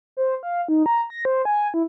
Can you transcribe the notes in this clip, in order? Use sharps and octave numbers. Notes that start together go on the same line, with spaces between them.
C5
F5
D#4
A#5
A#6
C5
G#5
E4